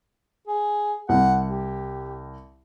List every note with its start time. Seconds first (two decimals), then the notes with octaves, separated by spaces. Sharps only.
0.47 G#4
1.09 C2 F#5
1.46 G4